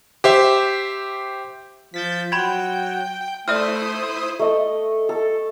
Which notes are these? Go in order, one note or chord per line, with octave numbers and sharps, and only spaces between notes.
G4 C5 E5
F3 G6 A6 B6
F#3 G5 B5 C6 G#6
A3 E4 C5 D5 E5 D#6 F6
A3 D#5
A4